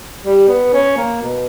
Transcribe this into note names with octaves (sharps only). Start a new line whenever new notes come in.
G3
B3
C#4
A#3
B2